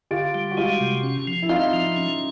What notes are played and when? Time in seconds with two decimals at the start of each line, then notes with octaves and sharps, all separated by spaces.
0.11 D3 F4 G4
0.34 G3
0.51 F#4
0.57 G#3 F4 G4
0.80 C3
1.03 C#4
1.27 F3
1.42 E4
1.49 C4 D#4 F4
1.73 F3
1.96 C#4